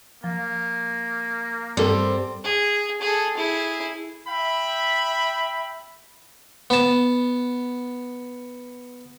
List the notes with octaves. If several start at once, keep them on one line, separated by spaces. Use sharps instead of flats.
F3 A#3
G2 G3 C4 A4 A#4
G#4
G#4 A4
E4 G#4
E5 G5 B5
B3 A5